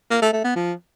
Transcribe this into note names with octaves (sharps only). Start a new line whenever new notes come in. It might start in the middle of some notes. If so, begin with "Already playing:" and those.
A#3
A3
A3
B3
F3